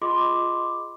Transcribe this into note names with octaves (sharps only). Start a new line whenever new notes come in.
F4 G#4 D#5 B5 C6 D6